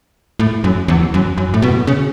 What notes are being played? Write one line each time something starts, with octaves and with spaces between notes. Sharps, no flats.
A2
F#2
E2
F#2
F#2
A2
B2
C#3